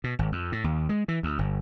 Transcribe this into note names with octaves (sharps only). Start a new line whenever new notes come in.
B2
G#1
F2
A2
D#2
G#3
E3
D2
G1